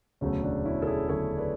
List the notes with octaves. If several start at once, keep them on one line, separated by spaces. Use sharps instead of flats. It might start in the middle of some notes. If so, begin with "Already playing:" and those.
E1 D2 C#3 F#3 A3 C#4
D4
C#4 E4
A4
E4 G#4
E1 D2 C#3 F#3 A3 A4 C#5
B4 D5